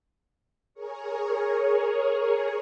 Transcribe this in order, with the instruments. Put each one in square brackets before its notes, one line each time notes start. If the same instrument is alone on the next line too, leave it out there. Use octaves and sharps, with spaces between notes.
[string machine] G#4 A#4 C#5